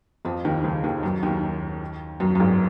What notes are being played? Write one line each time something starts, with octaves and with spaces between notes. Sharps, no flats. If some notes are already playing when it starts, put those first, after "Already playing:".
F2 F3
D#2 D#3
C#2 C#3
D#2 D#3
F#2 F#3
D#2 D#3
F#2 F#3
F#2
G#1 G#2